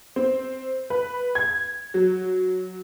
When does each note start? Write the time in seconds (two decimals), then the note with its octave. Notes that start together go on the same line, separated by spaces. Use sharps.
0.16 C4
0.90 B4
1.35 G#6
1.94 F#3